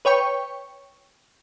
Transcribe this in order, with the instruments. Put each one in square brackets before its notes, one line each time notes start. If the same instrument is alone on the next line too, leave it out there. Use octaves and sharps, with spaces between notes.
[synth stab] B4 C#5 G5 C#6